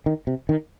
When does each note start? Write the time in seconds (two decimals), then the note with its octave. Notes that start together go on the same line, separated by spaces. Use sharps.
0.06 D#3
0.27 C3
0.49 D#3